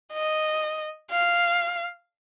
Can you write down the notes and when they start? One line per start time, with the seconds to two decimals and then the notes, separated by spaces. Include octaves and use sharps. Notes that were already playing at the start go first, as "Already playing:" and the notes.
0.13 D#5
1.11 F5